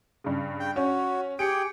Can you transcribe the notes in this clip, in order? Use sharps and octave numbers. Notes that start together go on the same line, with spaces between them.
G2 C#3
G5
C#4 F#4
G4 G#4 G5 C#7 D7